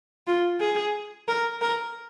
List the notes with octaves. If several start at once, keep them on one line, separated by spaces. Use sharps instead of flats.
F4
G#4
A#4
A#4